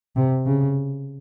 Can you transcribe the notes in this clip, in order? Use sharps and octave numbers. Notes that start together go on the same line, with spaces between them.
C3
C#3